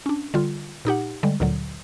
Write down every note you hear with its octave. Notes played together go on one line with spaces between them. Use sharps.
C#4 D4
D3 G3 F4
A#2 D#4 G4 F#5
D3 G3 G#3
D2 A#2 D3 F#3